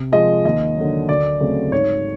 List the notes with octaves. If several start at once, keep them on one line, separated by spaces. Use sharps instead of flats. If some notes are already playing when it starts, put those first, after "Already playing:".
Already playing: C3
F3 G#3 D#5
D#2 D#5
D3 F#3
D2 D5
C#3 F#3 A3 C4
G#2 C#5